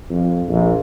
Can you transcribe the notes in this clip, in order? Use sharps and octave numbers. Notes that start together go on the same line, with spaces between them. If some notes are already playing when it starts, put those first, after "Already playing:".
F2
A#1